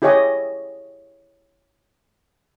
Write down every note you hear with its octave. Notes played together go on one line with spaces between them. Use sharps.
E4 G4 G#4 C#5 D#5 G#5